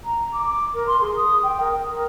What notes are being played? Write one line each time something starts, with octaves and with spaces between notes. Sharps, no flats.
A#5
D6
A#4
C6
G#4
D#6
G5
A#4
A#4